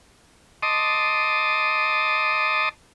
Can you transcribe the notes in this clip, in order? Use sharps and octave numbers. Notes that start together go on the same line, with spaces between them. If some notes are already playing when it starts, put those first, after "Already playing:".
D#5 A5 C6 D6 D#6